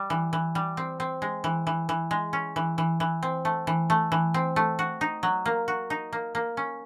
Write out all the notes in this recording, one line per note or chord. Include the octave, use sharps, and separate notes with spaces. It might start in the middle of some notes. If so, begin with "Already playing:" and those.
Already playing: G3
E3
E3
G3
C4
C4
G#3
E3
E3
E3
G#3
C#4
E3
E3
E3
C4
A3
E3
A3
E3
C4
A3
F#4
D#4
F#3
A#3
F#4
D#4
A#3
A#3
C#4